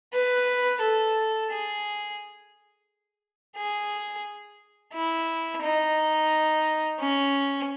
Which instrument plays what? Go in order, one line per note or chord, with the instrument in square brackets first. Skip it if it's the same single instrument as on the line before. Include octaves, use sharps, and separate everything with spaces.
[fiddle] B4
A4
G#4
G#4
E4
D#4
C#4